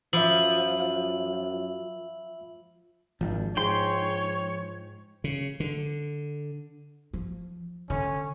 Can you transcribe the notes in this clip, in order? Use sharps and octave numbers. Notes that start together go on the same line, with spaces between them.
F#2 F3 E5 B5 E6 F#7
G#1 F3 D4
G#2 C#5 G5 C6
C#3
D3
F3
D3 C#4